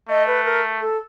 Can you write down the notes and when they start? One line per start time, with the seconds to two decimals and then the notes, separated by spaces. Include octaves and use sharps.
0.08 A3 D#5
0.27 B4
0.45 A#4
0.81 A4